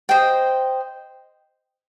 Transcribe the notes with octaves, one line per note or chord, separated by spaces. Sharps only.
C5 D#5 G5